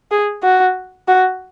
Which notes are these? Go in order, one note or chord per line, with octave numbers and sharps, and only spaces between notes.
G#4
F#4
F#4